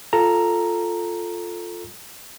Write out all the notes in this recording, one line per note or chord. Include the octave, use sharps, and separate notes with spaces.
F4 A4 A#5